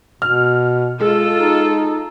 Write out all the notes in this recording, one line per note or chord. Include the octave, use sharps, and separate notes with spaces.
B2 F6
G#3 F4 A4
D#4